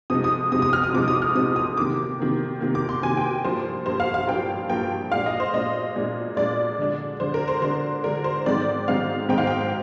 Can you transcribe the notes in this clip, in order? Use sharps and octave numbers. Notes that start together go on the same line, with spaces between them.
C3 F3 G#3 D#4 D#6
D#6
C3 F3 G#3 D#4 D#6
D#6
F6
D#6
C3 F3 G#3 D#4 D6
D#6
F6
C3 F3 G#3 D#4 D#6
D#6
C3 D#3 A#3 D6
C3 D#3 A#3
C3 D#3 A#3
D6
C6
C3 D#3 A#3 G#5
G5
G2 F3 A#3 C5
G2 F3 A#3 C5
F5
F5
G2 F3 A#3 G5
G2 F3 A#3 G5
A#2 G#3 D4 F5
D#5
C5
A#2 G#3 D4 D#5
A#2 G#3 D4
A#2 G#3 D4 D5
D3 G#3 D4
D3 G#3 D4 C5
A#4
C5
D3 G#3 D4 C5
D3 G#3 D4 A#4
C5
G#2 D#3 G#3 C4 D#4 D5
G#2 D#3 G#3 C4 D#4 F5
G#2 D#3 G#3 C4 D#4 G5
F5
G5